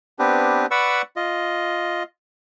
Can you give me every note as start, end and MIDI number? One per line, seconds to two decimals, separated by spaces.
0.19 0.66 59
0.19 0.66 60
0.19 0.66 62
0.19 0.66 67
0.19 0.66 71
0.71 1.02 71
0.71 1.02 74
0.71 1.02 78
0.71 1.02 83
0.71 1.02 85
0.71 1.02 88
1.16 2.03 65
1.16 2.03 75